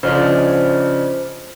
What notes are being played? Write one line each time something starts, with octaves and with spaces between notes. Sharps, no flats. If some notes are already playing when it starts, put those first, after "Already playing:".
C#3 F3 D4 C5 D#5